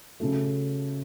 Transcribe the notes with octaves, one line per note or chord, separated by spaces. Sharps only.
C#3 F#3 A3